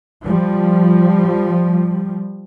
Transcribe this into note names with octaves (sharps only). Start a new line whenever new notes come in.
F3 G3